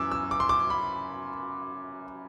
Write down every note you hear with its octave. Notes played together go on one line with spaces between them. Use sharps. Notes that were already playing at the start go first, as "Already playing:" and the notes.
Already playing: F#2 E3 D6 E6
E6
D6
C6
D6
B5